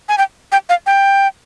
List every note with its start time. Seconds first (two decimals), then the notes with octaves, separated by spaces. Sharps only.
0.09 G#5
0.18 G5
0.52 G5
0.69 F5
0.86 G5